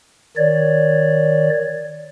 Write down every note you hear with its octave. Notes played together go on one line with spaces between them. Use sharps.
D#3 C#5 D5